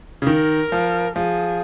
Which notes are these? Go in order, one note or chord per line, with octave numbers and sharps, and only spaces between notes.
C#3
D#3 A#4
F3
F3 G#4